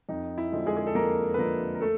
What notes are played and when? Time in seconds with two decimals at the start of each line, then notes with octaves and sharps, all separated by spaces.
0.09 F2 D#4
0.38 E4
0.52 D3 F3 G#3
0.66 G#3 G#4
0.77 G#4
0.87 A4
0.95 F2 A#3 A#4
1.34 B4
1.38 D3 F3 G#3 A#3 A#4
1.74 A#4
1.81 A3 A4